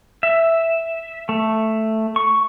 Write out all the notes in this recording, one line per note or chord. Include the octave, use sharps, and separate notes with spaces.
E5
A3
C#6